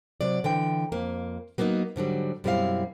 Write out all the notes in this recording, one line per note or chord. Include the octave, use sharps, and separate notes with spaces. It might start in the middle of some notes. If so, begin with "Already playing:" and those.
C3 F#3 D5
D3 E3 G5
F2 A#3
F#3 A#3 B3 D4 D#4
G#2 D3 F#3 G3
F#2 B2 G3 C4 E4 F5